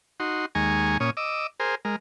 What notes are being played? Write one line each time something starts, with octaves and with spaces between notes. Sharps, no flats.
D#4 F#4 C6
D#2 G#3 G#5 A#5 C#6
A#2 C#4 C#5 D#6
D#5 D6 E6
G#4 A#4 C5
G#3 A#4